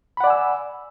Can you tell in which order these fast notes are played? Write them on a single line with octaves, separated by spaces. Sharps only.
B5 F#5 D5 G#5 E6